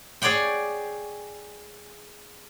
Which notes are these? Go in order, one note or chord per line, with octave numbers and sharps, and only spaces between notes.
G#4 C#5 D5 F#5 G5